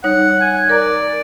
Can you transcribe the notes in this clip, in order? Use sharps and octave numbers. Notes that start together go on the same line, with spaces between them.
G3 D#4 C#5 F#5
G#5
A#4 D5 A#5